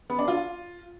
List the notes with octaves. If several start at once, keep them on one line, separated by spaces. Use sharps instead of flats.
B3
D4
F4